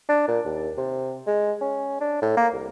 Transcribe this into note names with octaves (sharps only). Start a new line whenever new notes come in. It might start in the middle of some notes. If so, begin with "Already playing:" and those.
D4
A#2
D#2
C3
G#3
C#4
D4
A2
A#3
C2